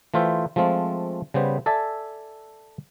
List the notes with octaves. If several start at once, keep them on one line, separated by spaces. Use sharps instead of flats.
E3 A3 F4 C5 E5 G5
F3 G#3 A3 C4 F4
C#3 G3 B3 C5
A4 D5 E5 G#5 A5